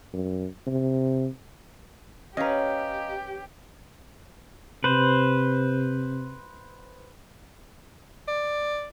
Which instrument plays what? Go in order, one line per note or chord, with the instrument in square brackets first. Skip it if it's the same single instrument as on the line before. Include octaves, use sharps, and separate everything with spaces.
[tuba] F#2
C3
[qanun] C#4 B4 [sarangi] G4 [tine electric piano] D#5 F5 A#5
[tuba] C3 [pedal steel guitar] B4 C5
[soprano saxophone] D5